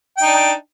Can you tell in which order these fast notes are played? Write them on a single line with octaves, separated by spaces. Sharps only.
G5 D#4 D4